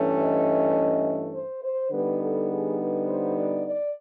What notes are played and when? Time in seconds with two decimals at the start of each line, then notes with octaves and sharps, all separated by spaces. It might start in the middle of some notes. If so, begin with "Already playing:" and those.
Already playing: G2 E3 A3 C#4
0.18 D#5
1.34 C5
1.62 C5
1.91 D3 G3 B3 D#4 B4
2.20 A4
2.49 G#4
2.78 B4
3.07 C5
3.35 D5
3.65 D5